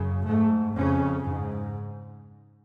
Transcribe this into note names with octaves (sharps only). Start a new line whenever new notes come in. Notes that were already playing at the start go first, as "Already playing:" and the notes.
Already playing: F#2 C#3
G#2 A3
F2 C#3 C#4
G#2